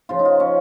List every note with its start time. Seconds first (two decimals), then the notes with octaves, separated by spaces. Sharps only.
0.09 C#3 F3 F4
0.19 D#4
0.25 F4
0.40 C#4